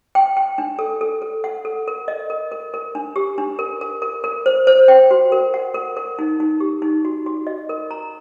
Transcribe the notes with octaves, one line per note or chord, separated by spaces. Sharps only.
G5
G5
D4
A4
A4
A4
F#5
A4
A#4
D#5
A#4
A#4
A#4
D4
G4
D4
A#4
A#4
A#4
A#4
C5
C5
G5
F#4
A#4
F#5
A#4
A#4
D#4
D#4
G4
D#4
F#4
F#4
D#5
A#4
A#5